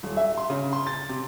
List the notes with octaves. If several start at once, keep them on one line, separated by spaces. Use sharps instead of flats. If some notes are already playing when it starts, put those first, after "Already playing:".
D#1
E5
C6
C#3
C6
A6
C3